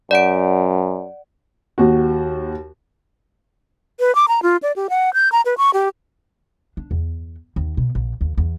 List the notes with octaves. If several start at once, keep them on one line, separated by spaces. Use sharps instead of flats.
F#2 D5 F#5 D7
D#2 F#4
B4
D6
A#5
F4
D5
G4
F#5
G6
A#5
B4
C#6
G4
D4
E2
D#2
B2
A#1
D#2
E2